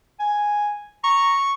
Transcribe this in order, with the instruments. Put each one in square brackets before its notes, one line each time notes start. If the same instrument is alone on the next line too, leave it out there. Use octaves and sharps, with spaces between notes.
[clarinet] G#5
[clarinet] A#5 [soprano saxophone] C#6